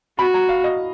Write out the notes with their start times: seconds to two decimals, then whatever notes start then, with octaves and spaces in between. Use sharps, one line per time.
0.19 F#4 B5
0.34 A#5
0.49 F5
0.64 D#5